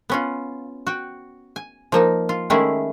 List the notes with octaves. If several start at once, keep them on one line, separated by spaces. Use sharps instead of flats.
B3 C#4 F4
F#4 G5
G#5
F3 A#3 D#4
F4
D#3 G#3 A3 C#4 E4 G#4